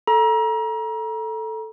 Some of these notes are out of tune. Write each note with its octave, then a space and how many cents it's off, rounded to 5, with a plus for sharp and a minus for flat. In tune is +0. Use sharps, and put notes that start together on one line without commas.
A4 +0 A#5 +30